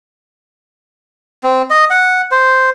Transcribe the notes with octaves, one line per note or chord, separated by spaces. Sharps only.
C4
D#5
F#5
C5